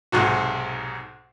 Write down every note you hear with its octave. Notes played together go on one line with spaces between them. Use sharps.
B1 G#2 C3 F#4